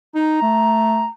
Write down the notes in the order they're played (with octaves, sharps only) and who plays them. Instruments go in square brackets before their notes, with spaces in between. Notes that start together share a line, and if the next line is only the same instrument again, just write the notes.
[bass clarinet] D#4 [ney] A#5
[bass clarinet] A3